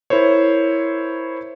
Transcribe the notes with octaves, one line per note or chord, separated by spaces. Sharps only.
E4 A#4 C5 C#5